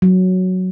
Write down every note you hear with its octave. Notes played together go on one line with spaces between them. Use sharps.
F#3